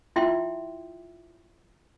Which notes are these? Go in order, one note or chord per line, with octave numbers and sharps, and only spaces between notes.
E4 F4 E5 G5 C6